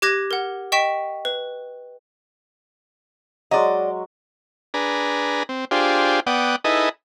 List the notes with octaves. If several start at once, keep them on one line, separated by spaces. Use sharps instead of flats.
G4 D6 F#6 G#6 A#6
A#4 F#5
D#5 G5 C#6 B6 E7
B4
F#3 G#3 D5 D#5 C#6
D4 G#4 B4 A#5
C4
D4 F4 G4 G#4 C5
B3 D5 F#5 G5 D#6
D#4 E4 G#4 A4 B4 D#5